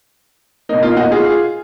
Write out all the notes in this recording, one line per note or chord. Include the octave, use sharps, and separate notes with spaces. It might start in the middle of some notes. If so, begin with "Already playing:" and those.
B2 A#3 D#4
F4
D#4 F#4
F4 G#4